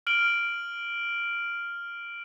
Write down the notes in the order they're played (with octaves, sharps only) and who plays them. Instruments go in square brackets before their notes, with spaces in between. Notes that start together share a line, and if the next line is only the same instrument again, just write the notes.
[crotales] F6 D7 F#7